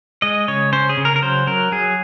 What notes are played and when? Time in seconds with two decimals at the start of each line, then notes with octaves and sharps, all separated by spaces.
0.22 G#3 D#5
0.48 C#3 C#5
0.73 C#4 C5
0.89 G#4
0.97 C#3
1.05 A#4
1.16 A#4
1.22 F#3 C5
1.47 F#3 A#4
1.72 F#3 G#4